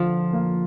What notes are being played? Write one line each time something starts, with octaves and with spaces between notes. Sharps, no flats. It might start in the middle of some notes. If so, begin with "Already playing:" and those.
Already playing: D3 F3 F4
A#3